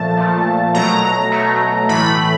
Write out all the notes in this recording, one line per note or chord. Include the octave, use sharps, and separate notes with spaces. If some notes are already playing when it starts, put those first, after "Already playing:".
Already playing: A#2 F3 A3 A5
A#2 F3 A3
B2 F#3 A3 A#5
B2 F#3 A3
A2 E3 A3 B5